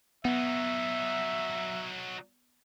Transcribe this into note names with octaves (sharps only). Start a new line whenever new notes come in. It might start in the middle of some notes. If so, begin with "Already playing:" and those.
F#3 B3 D#4 E5